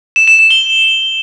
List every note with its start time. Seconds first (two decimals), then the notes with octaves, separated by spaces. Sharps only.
0.16 E7
0.28 E7
0.39 E7
0.51 G7